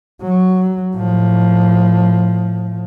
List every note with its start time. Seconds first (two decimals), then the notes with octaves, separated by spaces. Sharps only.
0.22 F#3
0.95 A2 F3